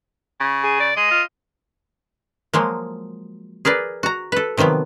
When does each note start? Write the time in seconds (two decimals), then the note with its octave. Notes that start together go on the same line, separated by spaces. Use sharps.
0.40 C#3
0.64 G#4
0.80 D5
0.97 G#3 D#5
1.11 F4
2.53 F3 F#3 G#3 A#3
3.65 G#4 A#4 B4 D5
4.03 F#4 A#5
4.32 A4 B4
4.57 C3 D#3 F3 F#3 B3